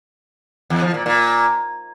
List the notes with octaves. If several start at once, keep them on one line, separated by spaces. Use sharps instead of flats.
E2
F3
A#2
A#2